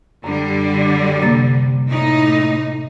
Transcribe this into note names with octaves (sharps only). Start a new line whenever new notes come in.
F#2 D3 G3
C3 A#3 A6
A2 D#4